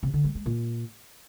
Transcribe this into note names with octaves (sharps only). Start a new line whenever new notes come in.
C3
D3
G3
G#3
A#2